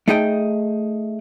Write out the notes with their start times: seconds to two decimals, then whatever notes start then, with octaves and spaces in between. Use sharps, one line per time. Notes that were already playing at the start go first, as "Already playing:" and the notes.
0.08 A3 D#4 G#4 D#5 G5